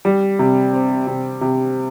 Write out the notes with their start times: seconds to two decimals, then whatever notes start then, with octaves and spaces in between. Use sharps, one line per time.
0.05 G3
0.39 C3
0.73 C4
1.07 C3
1.41 C3